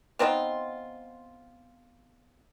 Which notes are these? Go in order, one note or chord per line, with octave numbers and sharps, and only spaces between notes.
B3 C4 D#4 F4